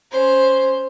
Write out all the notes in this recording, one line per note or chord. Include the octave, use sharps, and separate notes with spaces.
C#4 C5